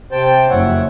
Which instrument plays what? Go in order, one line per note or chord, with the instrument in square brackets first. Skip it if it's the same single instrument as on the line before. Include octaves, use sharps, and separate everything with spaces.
[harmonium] C3 G5 A5 [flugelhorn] C5
[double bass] F#1 F2 [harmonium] C#5 E5 F#5